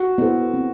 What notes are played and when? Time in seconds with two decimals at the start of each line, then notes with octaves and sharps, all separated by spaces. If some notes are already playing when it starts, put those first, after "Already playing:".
Already playing: F#4
0.18 B3 E4 A4 C5
0.54 C4